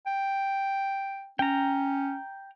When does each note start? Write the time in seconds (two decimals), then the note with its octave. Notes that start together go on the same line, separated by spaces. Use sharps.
0.06 G5
1.39 C#4 G5 A#5